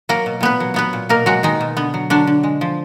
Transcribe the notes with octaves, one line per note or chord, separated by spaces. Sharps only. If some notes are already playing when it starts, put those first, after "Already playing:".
F#3 A#3 A#4
B2
A#2 B3 B4
F#3
F#3 B3 B4
A#2
B2 A#3 A#4
F#3 G#3 F#4
D#3 G#3 D#4
B2
D3 B3
F#3
D3 F#3 D4
D3
G#3
F3